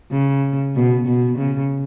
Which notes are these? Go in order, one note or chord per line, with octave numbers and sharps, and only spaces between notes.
C#3
B2
B2
C#3